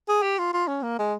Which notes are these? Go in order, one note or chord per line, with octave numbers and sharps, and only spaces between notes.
G#4
G4
F4
F4
C#4
A#3
G#3